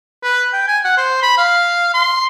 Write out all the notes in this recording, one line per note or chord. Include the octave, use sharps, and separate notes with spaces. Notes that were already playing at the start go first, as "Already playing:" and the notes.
B4
G5
G#5
F#5
C5
B5
F5
C6